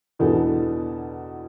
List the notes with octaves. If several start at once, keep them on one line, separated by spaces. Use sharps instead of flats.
E2 B2 B3 D4 A4